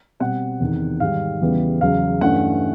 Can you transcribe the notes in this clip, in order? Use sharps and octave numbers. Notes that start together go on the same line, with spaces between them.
B2 G3 C4 F#5
E2 C3 D#3
G#2 D#3 G3 F5
E2 C#3 E3 G3 B3
E2 C#3 F#3 F5
G2 E3 A3 C#4 F#5